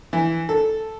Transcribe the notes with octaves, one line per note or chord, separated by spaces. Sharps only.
E3
A4